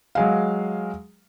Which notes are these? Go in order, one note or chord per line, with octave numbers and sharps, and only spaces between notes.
F#3 G#3 F5